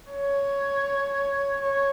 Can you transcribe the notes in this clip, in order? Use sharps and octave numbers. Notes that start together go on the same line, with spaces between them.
C#5
C#5